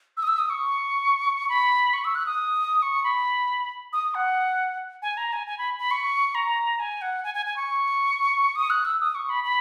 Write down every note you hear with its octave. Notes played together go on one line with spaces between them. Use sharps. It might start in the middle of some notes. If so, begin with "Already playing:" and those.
E6
D#6
E6
D#6
C#6
B5
C#6
E6
F#6
D#6
C#6
B5
D#6
F#5
G#5
A#5
G#5
G#5
B5
B5
C#6
A#5
G#5
F#5
G#5
G#5
G#5
C#6
D#6
F#6
E6
D#6
C#6
B5
B5